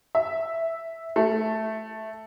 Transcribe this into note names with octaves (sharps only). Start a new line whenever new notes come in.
E5
A3